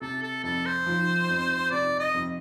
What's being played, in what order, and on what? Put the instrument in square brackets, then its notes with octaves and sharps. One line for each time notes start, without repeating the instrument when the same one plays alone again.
[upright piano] C3 [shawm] A4
[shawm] A4
[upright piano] F2 [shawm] A4
[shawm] C5
[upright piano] F3
F2
[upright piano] C3 [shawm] D5
[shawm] D#5
[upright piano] F2